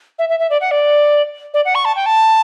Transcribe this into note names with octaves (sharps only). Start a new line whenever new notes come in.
E5
E5
E5
D5
F#5
D5
D5
F#5
C#6
A5
G5
A5